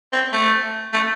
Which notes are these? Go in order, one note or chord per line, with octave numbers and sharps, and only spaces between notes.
C4
A3
A3